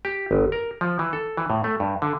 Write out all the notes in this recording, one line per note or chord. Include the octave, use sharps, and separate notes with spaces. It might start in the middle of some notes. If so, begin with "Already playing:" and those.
G4
G1
A#4
F3
E3
A4
E3
A2
A3
G2
D3